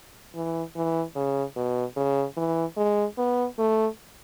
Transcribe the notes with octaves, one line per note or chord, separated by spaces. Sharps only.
E3
E3
C#3
B2
C#3
E3
G#3
B3
A3